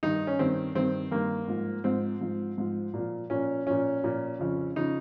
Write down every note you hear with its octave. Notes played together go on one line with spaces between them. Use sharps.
G2 D#3 D#4
C#4
G2 D#3 C4
G2 D#3 C4
G2 D#3 A#3
G#2 F3
G#2 F3 C4
G#2 F3
G#2 F3
A#2 F3
A#2 F3 C#4
A#2 F3 C#4
A#2 F3
F2 C#3 F3
C#3 F3 D#4